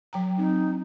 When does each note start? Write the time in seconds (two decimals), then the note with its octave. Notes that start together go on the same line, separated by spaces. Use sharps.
0.13 F#3 G5 A#5
0.38 F#3 C4 D#4